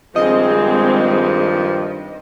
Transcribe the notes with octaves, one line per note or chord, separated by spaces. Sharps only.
G2 D#3 F3 G#3 C4 G#4 D#5